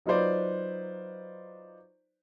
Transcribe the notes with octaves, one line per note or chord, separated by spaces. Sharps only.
F#3 D#4 F4 B4 C5 D5